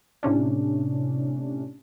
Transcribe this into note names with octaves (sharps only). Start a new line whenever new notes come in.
A2 C3 C#4 D4